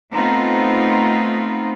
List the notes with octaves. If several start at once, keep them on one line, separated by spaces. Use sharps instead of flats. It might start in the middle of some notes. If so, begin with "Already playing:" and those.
A3 B3 C4 D#4 F4